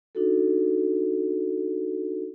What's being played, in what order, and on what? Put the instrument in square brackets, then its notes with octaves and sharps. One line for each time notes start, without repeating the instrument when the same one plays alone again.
[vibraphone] D4 D#4 F#4 A4